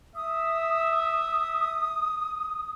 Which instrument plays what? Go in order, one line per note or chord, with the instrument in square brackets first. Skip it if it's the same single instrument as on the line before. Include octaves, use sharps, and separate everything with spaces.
[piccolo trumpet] E5 [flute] D#6